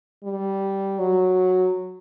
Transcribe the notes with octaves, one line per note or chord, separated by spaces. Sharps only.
G3
F#3